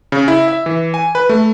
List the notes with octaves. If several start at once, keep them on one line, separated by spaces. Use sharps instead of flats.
C#3
E4
E5
E3
G#5
B4
A3